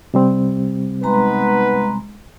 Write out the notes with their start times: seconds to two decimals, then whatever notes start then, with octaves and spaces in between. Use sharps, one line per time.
0.14 C3 G3 C4
1.03 G#3 B3 D#4 B4 A#5 C6